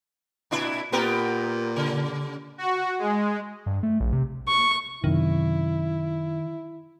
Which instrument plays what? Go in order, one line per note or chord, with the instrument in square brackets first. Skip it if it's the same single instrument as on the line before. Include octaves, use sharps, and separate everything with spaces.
[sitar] A#2 D4 E4
[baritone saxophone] A#2 [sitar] B3 G4 A#4
[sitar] C#3
[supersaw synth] F#4
G#3
[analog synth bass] G2
A3
A#1
C3
[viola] C#6
[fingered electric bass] F#2 C3 [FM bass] D#3 [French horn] E4